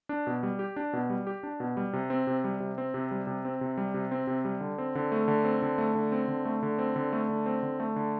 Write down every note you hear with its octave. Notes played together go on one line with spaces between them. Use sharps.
D4
B2
G3
G4
D4
B2
G3
G4
D4
B2
G3
C3
C4
C3
G3
C3
C4
C3
G3
C3
C4
C3
G3
C3
C4
C3
G3
D3
C4
D3
A3
D3
C4
D3
A3
D3
C4
D3
A3
D3
C4
D3
A3
D3
C4
D3
A3
D3